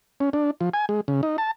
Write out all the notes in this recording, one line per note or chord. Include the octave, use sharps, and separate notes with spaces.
C#4
D4
F3
G#5
G#3
C#3
D#4
A5